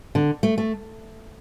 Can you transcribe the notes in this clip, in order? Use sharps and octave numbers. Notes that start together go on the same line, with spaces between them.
D3
A3
A3